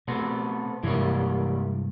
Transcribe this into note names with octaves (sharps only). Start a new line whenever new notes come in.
B2 A3 B3 C4
G2 C3 E3 G3 G#3 A#3